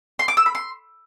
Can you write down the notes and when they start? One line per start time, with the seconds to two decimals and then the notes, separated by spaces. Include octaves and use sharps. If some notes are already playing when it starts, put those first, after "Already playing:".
0.19 C6
0.28 D6
0.37 E6
0.46 B5
0.55 C6